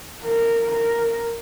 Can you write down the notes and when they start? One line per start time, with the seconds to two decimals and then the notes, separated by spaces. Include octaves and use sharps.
0.24 A#4
0.72 A#4